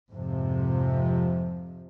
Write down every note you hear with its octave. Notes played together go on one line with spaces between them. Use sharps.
F2 G#2 C3 F3